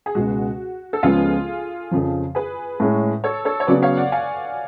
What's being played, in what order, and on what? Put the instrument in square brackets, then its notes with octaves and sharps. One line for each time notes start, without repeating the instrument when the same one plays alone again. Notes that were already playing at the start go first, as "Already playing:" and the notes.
[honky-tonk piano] G#4
[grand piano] C#2 B2 G#3 [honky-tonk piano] F#4
[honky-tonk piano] A4
[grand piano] C#2 C#3 F3 G#3 B3 [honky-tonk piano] F4 G#4
[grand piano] F2 C#3 F3
[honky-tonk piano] G#4 B4
[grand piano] A2 G#3 C#4
[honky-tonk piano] A4 C#5
A4 C#5
C#5
[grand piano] C#3 F#3 B3 [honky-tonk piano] B4 D5
[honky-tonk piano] C#5 F5
D5 F#5
F5 G#5